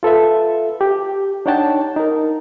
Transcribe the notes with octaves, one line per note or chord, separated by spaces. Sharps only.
F4 A4 B4 E5
G4
D4 D#4 C#5 F#5 G5 A5
D#4 A#4